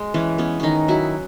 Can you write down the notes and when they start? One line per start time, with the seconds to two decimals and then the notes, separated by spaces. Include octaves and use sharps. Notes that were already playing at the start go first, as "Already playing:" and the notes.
Already playing: G#3
0.14 E3 C#4
0.38 B3 C#4
0.60 D#3 C#4 D#4
0.88 F#3 E4